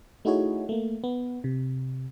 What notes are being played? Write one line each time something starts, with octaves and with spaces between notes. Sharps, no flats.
A3 D#4 E4 F#4 G#4 C#5
A3 A#3
B3
C3